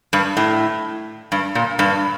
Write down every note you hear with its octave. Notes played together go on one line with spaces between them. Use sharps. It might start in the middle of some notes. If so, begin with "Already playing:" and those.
G2
A2
G2
A#2
G2